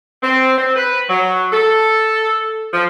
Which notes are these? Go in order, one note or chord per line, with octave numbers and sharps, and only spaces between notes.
C4
C4
B4
F#3
A4
F3